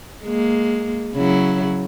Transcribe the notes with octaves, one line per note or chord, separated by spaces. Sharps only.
G#3 A#3
C#3 F#3 E4